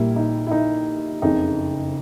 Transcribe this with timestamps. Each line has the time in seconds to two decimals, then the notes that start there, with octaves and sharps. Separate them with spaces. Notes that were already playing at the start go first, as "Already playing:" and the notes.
Already playing: A#1 A#2 G3 A#3 E4
0.16 D#4
0.47 E4
0.51 D#4
1.22 F#1 F2 C#3 D#4